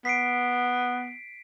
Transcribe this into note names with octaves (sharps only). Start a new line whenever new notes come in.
B3 B6 C7 D7